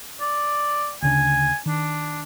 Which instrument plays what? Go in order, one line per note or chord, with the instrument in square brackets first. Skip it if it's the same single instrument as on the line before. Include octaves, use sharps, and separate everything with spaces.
[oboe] D5
[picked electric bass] D2 C#3 D4 [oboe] G#5
[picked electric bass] D#3 [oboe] D4